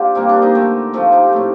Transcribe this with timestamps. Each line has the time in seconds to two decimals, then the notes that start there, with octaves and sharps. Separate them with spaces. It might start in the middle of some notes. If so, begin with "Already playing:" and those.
Already playing: D4 F4 G4 C5
0.15 C3 G3 A#3 C4
0.29 D4
0.42 C4 D#4
0.55 D3 A3
0.93 C3 F3 A3 C4
1.12 D#4 G4
1.33 A2 A3